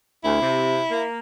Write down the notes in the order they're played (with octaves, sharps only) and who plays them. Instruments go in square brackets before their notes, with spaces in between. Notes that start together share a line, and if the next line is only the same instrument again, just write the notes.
[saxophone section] D2 [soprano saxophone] E4
[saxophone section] C3
A#3